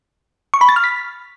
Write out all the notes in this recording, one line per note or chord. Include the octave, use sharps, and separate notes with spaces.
C#6
B5
A6
F6
B6